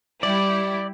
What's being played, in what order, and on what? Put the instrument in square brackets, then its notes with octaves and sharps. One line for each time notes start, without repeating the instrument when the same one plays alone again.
[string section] G3 E4 G4 [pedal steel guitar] D5